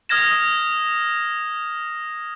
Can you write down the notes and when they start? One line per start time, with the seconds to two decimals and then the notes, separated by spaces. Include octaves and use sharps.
0.09 D#6 F6 G#6 A#6 E7